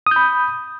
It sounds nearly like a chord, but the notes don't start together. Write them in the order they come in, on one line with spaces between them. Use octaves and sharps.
D#6 G6 B5